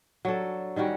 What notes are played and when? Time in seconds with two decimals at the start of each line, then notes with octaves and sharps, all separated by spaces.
0.25 F#3 D4 A4
0.76 D#3 G3 C#4 F#4